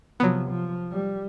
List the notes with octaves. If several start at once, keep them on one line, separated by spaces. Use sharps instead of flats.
C3 F3 F#3 B3
F3
G3